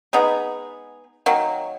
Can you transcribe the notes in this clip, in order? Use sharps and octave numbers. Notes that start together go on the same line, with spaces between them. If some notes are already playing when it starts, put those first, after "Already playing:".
G#3 B3 D#4 G#4
D#3 F#3 A#3